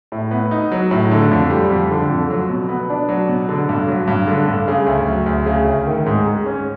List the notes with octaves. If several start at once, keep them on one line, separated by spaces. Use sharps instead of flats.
A2
B3
D#4
F#3
A2
D3
F2
G3
F2
D3
F2
F#3
B2
B3
D4
F#3
B2
D3
G2
F#3
G2
D3
G2
C#3
D2
F#3
D2
C#3
D2
D#3
G#2
G#3
C#4